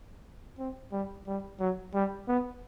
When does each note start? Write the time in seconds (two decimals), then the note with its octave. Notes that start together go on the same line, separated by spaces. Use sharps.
0.59 C4
0.92 G3
1.27 G3
1.60 F#3
1.94 G3
2.28 B3